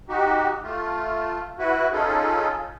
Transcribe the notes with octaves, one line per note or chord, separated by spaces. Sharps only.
D#4 F#4 G4
A3 F4
E4 F#4 B4
C#4 D#4 F4 G#4 A4